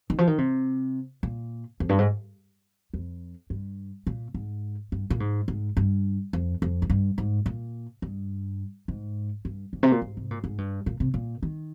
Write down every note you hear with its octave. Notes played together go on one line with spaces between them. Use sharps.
D#3
F3
D#3
C3
A#2
F2
G2
G#2
F2
G2
A#2
G#2
G2
A#2
G#2
G#2
G2
F2
F2
G#2
G2
G#2
A#2
G2
G#2
G2
G#2
C3
A#2
G#2
C3
A#2
G#2
G2
A#2
C3
A#2
D#3